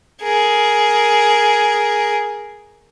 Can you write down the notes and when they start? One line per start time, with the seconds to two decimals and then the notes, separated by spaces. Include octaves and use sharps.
0.22 G#4 A#4